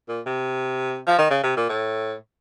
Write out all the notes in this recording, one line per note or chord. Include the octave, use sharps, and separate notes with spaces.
A#2
C3
F3
D#3
C#3
C3
A#2
A2